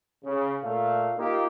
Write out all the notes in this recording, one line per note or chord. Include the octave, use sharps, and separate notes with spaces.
C#3
A#2 A3 F5
A#3 D#4 F4 G4